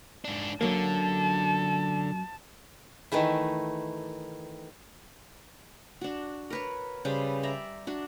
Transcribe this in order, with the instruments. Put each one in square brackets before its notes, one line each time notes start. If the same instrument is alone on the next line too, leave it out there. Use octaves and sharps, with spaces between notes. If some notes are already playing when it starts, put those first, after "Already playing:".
[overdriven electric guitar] G#2 D4
[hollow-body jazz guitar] F#2 F#3 A#3 [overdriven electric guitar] D3 [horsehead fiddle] A5
[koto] D#3 E3 A3 E4
[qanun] D4 F#4
A#4 B4 C#5
C#3 G3 B4 C5
D5 E5 A#5
D4 F#4